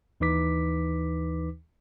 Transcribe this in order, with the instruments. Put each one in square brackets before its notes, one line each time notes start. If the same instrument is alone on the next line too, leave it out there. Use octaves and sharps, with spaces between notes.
[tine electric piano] D#2 E3 D#4 B4 D6 B6